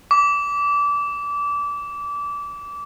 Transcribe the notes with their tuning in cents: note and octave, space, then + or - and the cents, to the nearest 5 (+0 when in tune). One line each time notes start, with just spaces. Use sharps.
D6 -25